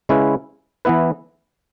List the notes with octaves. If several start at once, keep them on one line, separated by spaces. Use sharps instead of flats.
C#3 G#3 C#4 E4 B4
E3 B3 E4 B4